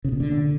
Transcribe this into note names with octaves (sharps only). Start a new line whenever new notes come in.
C#3
A#2
D3